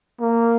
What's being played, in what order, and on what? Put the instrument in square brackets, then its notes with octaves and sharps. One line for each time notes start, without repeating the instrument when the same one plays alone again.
[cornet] A#3